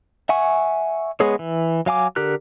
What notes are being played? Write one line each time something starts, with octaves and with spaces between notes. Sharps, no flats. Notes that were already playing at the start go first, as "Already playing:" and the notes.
E5 F#5 G#5 C#6
G#3 B3 G#4 C#5
E3
F#3 F5 G#5 D6
D3 G4 A#4 F#6